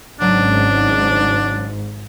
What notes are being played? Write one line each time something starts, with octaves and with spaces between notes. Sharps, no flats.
G#1 G#2 C#3 F#3 C#4 D4